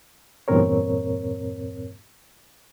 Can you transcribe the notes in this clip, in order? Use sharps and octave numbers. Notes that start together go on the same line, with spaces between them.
E2 G2 A#2 C4 A#4 C#5